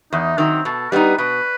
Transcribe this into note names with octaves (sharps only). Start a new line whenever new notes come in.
E2 D#4
D#3 F#3 C4
B2 A4
G3 B3 D#4 B4
B2 B4